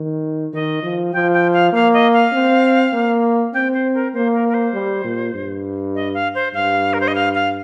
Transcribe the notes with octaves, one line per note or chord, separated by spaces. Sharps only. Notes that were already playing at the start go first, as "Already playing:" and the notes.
Already playing: D#3
D#3 D#5
F3
F3 G5
G5
F5
A#3 F5
D#5
F5
C4
A#3
C4 G5
C5
A#4
A#3 C5
A#4
A#4
C5
G3
A#2
G2
D#5
F5
C5
G2 F5
A#4
C5
D#5
F5
F5